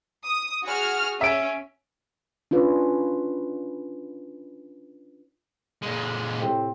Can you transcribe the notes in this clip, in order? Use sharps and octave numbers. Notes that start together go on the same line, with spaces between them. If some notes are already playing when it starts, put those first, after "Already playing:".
D#6
F#4 G#4 F6
C#4 E5 D7
C#4 D4 F4 B4
A#2 G#3
A2 C3 C4